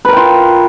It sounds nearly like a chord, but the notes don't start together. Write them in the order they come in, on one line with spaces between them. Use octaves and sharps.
B4 A#4 G5 F4